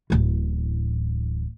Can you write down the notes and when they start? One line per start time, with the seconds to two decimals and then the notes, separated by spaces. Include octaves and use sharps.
0.10 D1 A1